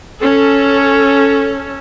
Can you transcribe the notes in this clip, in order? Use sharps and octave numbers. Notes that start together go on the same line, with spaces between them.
C#4 A4